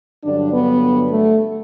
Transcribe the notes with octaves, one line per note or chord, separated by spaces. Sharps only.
G2 D3 F#3 D4
B3
A3